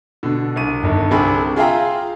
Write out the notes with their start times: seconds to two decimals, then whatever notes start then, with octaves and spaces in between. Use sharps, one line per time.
0.23 B2 D3
0.56 C2 D#7
0.83 G1 G2 D#3
1.11 C2 D3 C4 D4 G#4 B5
1.56 F4 G#4 E5 F5 G5 A#5